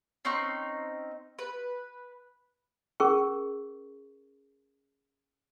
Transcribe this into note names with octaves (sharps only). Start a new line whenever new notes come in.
C4 C#4 D#4 C#6
B4
C#4 G#4 A#4 C#6